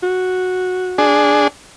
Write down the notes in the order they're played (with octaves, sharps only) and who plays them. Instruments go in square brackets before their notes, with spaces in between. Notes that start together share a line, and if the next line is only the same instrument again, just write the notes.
[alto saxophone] F#4
[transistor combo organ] D4 G#4